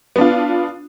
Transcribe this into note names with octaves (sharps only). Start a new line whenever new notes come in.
B3 D4 F4